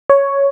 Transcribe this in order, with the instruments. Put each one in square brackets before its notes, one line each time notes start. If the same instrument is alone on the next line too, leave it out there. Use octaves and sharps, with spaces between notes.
[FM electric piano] C#5